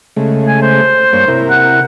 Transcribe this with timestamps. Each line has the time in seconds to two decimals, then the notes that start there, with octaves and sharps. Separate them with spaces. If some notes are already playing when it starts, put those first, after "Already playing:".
0.17 C#3 G#3 A3
0.48 G#5
0.62 C5
1.13 G2 A#3 C#5
1.28 C3 E4 A#4
1.50 F#5